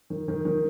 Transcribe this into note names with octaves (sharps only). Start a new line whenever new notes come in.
D#3
D#3
D#3